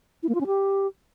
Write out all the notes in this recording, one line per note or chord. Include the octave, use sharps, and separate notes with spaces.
E4
A#3
F4
C#4
G4